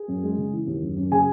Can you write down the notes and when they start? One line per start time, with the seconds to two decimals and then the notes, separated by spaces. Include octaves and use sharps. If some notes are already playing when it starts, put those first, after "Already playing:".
Already playing: G#4
0.08 F#2
0.23 G#3
0.38 C#3
0.53 E3
0.67 D#2
0.82 F#1
0.97 F#2
1.12 C#3 G#4 G#5